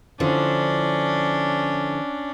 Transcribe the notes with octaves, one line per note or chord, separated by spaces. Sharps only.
D3 F3 C#4 D4 E4